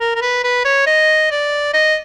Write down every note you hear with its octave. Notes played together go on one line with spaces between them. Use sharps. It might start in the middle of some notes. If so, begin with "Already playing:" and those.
A#4
A#4
B4
B4
C#5
D#5
D5
D#5